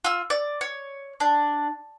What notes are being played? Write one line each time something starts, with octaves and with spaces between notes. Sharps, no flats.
F4 E6
D5
C#5
D4